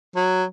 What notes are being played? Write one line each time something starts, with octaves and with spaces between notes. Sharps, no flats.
F#3